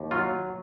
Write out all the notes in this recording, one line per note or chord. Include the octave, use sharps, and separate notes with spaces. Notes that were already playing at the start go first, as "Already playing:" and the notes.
Already playing: D#2
F#3 F4